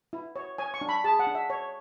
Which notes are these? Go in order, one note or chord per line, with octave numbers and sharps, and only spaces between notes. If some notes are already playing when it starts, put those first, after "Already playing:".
E4
C#5
C#5 G#5
C#6
D4
B5
G#4 A5
F#5
D4
E5
C#5